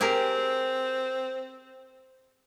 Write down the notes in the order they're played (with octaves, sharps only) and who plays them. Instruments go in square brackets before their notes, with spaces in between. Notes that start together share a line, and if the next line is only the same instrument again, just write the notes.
[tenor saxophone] C4 [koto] G4 G#4 A#4